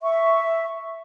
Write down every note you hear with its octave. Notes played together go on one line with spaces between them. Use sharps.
E5 C#6